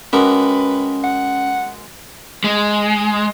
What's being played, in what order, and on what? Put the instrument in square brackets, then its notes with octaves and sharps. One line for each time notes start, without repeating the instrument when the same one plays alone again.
[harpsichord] G#3 F#4 A#4 [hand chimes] C#4 [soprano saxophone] B4
[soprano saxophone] F#5
[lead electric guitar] G#3